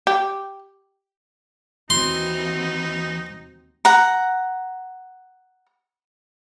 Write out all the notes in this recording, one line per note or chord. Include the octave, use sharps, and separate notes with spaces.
G4
D#2 E3 C4 D#4 F#4 C6
F#5 A#5